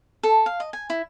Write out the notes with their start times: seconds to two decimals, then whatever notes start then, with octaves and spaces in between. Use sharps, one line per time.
0.23 A4
0.46 F5
0.60 D#5
0.73 G#5
0.90 E4